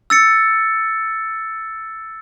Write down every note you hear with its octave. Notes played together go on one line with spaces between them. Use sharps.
E6 A6 C#7